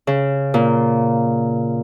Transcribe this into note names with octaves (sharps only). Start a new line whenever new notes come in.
C#3
A#2